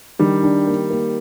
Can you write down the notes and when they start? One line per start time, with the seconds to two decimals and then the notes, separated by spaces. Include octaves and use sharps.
0.19 D#3 G3 D4
0.43 D4
0.67 A#3
0.90 A#3